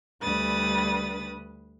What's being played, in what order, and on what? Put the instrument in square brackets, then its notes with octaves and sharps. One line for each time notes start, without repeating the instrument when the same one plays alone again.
[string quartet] D2 G3 B4 B5 D#6 A6